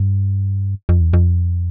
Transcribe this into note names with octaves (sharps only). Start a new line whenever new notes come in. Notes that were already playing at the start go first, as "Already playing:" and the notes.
Already playing: G2
F2
E2
F2